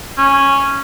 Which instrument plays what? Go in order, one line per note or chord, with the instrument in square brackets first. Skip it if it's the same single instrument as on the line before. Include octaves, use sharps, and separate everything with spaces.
[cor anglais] C#4